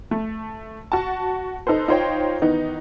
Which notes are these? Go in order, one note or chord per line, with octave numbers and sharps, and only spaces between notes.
A3
F#4 A5
D#4 A4 B4 C5
D#4 F4 C5 C#5 G5
D#3 E3 B3 D#4